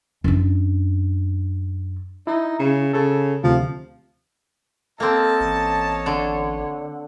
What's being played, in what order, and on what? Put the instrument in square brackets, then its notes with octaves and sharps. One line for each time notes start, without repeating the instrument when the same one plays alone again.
[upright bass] F#2 D4
[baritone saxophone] D#4 [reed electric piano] E4
[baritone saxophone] C#3
[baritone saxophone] C#3 [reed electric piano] A4
[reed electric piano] D2 C3 [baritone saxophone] F3
[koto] A#3 C4 [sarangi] A4 [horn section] D#5 A5
[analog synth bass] A1 [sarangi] C#5
[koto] D3